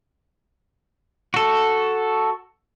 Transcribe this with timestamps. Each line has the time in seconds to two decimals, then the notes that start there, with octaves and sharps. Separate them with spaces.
1.34 F#4 A4